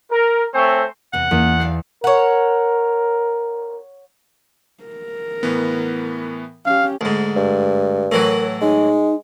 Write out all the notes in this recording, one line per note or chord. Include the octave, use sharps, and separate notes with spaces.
A#4
A3 C4 C5 C#5 G#5
E2 C3 F#5
E2 A#3 B3 C#4
C5 D5 F5 C7
A#4 C#5 F#5
A#4
A2 E3 B3
C#4 G4 F5
D2 G#2
G2
A2 E3 F#3 A#4
G#3 D#4